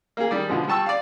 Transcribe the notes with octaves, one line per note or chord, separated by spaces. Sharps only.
A#3 G#4
D#3 G3 D5
B2 D3 F3 G#3
G3 G5 A5 C#6 E6
D5 F5